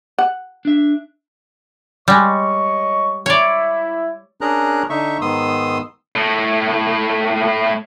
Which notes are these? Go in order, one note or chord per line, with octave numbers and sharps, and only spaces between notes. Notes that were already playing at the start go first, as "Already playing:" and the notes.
F#5
D4 E5
G3 G#3 C#5 D#5 C#6
E4 C#5 D5
C#4 D4 G#4 A#4 A#5 F#6
D3 D#4 E5 C#6
G#2 D#3 B3 C6 D#6 E6
A2 A3